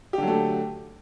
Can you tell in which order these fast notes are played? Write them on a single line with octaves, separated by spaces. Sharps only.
G4 D3 F#3 A3